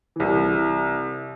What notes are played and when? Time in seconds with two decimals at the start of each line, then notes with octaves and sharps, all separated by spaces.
0.16 C2 E3